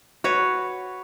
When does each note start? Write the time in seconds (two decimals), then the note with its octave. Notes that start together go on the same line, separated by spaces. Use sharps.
0.24 F#4 B4 C#5